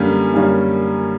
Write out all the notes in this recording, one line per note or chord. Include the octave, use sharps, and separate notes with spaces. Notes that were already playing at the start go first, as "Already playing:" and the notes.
Already playing: F#2 D3 G3 A#3 C#4
F#2 D3 G3 A#3 C#4